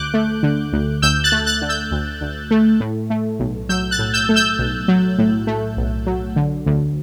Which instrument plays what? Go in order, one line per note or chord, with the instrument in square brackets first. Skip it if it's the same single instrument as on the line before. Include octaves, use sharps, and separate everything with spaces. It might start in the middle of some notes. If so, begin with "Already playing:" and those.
Already playing: [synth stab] D2 D6 F#6 G6
A3
D3
D2
D2 E6 G6
F#6 A6
A3
F#6 A6
D3
E6 G6
D2
D2
A3
A2
A3
B1
F#3 E6 G6
F#6 A6
A2
E6 G6
A3
E6 G6
B1
F#3
A2
A3
B1
F#3
D3
D2